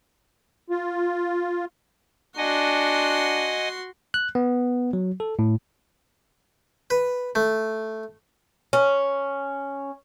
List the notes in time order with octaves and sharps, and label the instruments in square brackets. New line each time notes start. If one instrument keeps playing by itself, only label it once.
[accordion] F4
[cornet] D4 [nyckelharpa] F#4 C6 [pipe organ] D#5 F#5 G#5
[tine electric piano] F#6
B3
F#3
A4
A2
[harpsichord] B4
A3
[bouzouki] C#4